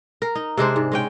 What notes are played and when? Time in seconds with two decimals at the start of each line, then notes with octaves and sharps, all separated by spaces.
0.22 A#4
0.35 D#4
0.57 C3 G#3 D4 C5
0.76 G#2
0.92 G#3 C#4 G5